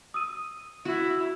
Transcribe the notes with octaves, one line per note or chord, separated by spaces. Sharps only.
D#6 E6 D#7
E4 F#4